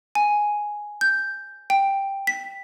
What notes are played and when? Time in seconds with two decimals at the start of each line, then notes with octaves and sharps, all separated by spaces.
0.15 G#5
1.01 G6
1.70 G5
2.27 B6